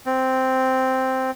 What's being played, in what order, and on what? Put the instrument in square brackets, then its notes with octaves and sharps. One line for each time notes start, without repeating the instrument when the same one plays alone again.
[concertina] C4